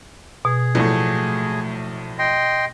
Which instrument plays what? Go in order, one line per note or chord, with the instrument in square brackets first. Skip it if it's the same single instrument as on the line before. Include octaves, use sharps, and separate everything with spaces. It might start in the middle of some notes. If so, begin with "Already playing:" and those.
[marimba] B2 [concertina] G#4
[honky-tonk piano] A#1 A2 [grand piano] F#3 A3
[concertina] D#5 G5 C6